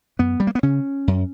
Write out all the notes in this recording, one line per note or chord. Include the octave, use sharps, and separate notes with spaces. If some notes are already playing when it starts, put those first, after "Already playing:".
F#2 B3
G3
A#3
B3
C#3 C#4
F#2